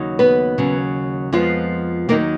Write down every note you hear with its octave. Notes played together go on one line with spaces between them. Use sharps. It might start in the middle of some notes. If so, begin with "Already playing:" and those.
Already playing: D#2 C#3 F#3 D#4
B3 B4
D#2 C#3 F#3
F2 F3 G#3 B3 F4
D#2 D#3 F#3 A#3 B3 D#4 A#4